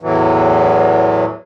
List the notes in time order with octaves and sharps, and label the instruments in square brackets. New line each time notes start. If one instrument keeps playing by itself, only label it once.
[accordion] E2 A2 E3 F#3